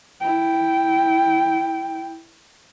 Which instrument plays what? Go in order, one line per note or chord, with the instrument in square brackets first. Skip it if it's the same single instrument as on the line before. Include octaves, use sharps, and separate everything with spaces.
[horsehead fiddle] E4 G5